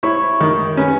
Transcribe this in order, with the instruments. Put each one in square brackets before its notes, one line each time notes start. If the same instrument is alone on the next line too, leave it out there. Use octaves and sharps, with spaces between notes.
[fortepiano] E4 [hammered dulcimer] C#5
[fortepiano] D#3
[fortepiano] C#4 [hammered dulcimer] B4